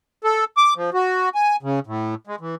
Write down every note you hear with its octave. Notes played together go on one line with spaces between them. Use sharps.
A4
D6
F3
F#4
G#5
C#3
A2
G#3
E3